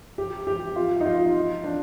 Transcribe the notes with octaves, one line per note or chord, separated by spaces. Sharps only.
G4
G4
F4
D#4
F4
D4